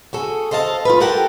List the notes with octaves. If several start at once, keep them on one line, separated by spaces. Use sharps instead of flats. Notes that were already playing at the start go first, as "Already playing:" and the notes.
F#4 G#4 A4
A4 C5 D#5 F5 A5
F4 B4
G4 A4 A#4 F#5 G5 A5